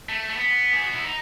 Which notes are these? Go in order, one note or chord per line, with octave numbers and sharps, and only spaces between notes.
A3
A3
B3
G#4
F#4
E4
D#4